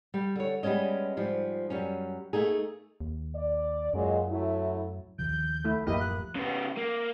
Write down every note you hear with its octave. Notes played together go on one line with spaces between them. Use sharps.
G3
D3 C#5
G3 G#3 B3 C#4 D#5
G#2 F3 G3
F#2 G3 C#4
A3 A#3 D#4 G#4
D#2
D5
F#2 A#2 F#3 G#3
F#3 A3 E4
D#2 D#3 F3 G6
A3 E4
D1 F#2 F3 A#3 E4 G4 D#5
F#6
C#3 B3
A#3